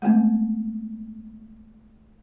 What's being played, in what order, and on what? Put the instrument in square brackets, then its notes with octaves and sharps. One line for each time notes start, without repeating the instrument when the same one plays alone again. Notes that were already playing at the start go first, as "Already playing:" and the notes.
[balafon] G#3 A3 B3 C4